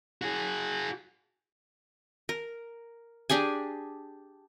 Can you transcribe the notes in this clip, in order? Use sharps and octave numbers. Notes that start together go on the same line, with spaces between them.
F#4 G#4
A#4
D4 G4 G#4 G#5